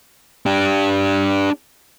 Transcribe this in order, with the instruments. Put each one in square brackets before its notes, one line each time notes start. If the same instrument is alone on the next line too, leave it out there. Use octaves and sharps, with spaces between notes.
[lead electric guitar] D4 G4